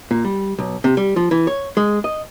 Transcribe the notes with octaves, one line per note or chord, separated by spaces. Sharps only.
A#2
G3
B1
C3
G3
F3
E3
C#5
G#3
D#5